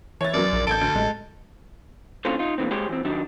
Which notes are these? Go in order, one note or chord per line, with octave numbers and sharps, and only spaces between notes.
E3 C#5 A6
F#2 F#3 D5
A#1
A1 A4 G6 G#6 D7
D2
A1 G#3
A2 D3 C4 C#4 F4
D#4 F4
A#2 D3 E3 C4
G#3 G4 G#4 C5 C#5 G5
E3 C4
D#3 F#3 G3 D4 D#4